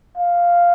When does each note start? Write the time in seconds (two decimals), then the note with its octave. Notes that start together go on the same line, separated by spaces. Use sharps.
0.17 F5